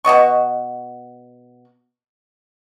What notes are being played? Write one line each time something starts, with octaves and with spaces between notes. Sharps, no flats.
B2 F#4 D#5 C#6